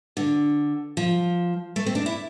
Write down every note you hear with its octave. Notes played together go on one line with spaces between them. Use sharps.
D3
F3
A3
C4
D4
E4